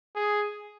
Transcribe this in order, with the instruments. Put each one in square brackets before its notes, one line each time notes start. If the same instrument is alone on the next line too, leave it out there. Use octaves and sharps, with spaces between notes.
[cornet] G#4